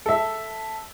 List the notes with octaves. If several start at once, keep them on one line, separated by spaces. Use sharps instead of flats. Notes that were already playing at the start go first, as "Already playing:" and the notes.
A4 E5